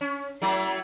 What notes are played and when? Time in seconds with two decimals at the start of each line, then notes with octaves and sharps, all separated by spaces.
0.01 C#4
0.42 F#3 A3 E4